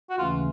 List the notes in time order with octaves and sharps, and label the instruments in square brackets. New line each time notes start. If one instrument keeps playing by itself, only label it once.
[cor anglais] F#4
[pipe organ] D#2 C#3 E3 A3 C#4 [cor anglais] F4